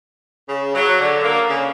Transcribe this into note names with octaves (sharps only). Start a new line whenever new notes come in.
C#3
F#3
D3
A#3
C#3